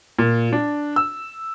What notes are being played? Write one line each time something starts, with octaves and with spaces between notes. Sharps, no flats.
A#2
D4
E6